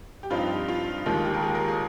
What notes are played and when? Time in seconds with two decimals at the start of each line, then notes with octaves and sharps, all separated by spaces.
0.23 G4
0.30 G2 F3 C4 D#4 F4
0.68 F4
1.06 D#2 D#3 G#3 F4
1.25 G4
1.34 A#4
1.43 G#4
1.55 A#4
1.68 G#4